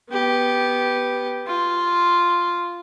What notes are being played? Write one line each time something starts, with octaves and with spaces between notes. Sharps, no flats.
B3 G4
F4